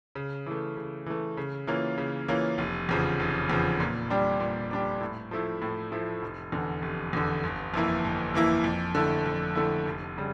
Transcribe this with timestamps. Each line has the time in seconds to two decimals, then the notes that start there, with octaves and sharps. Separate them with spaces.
0.15 C#3
0.46 E3 A3
0.76 C#3
1.06 E3 A3
1.37 C#3
1.67 E3 A#3 C#4 F4
1.98 C#3
2.28 E3 A#3 C#4 F4
2.58 F1
2.89 E2 C#3 F3
3.20 F1
3.50 E2 C#3 F3
3.80 A#2
4.10 G3 D4 G4
4.40 A#2
4.71 G3 D4 G4
5.00 A2
5.31 F3 A3 E4
5.62 A2
5.92 F3 A3 E4
6.22 F1
6.52 E2 D3
6.82 F1
7.13 E2 D3
7.43 G1
7.74 F2 E3 A#3 E4
8.04 G1
8.34 F2 E3 A#3 E4
8.64 F2
8.95 D3 A3 E4
9.26 F2
9.55 D3 A3 E4
9.86 F1
10.18 C#3 G3